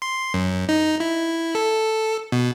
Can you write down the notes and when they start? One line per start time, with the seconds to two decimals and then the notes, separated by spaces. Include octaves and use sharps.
0.02 C6
0.34 F#2
0.69 D#4
1.00 E4
1.55 A4
2.32 B2